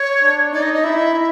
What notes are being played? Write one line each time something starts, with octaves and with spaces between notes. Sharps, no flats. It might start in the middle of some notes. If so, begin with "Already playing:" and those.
Already playing: C#5
D4
D#4 D5
D#5
D#5
E4 E5